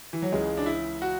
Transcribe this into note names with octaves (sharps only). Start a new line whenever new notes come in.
E3
F#3
C#2 C#3 E3 G#3
D4
E4
F#4